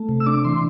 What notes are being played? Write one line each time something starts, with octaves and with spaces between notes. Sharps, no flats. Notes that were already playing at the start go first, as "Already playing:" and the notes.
Already playing: A3
C3
E6
D4 D6
E3 C6